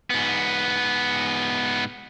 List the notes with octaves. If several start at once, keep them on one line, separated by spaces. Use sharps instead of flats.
G#2 B3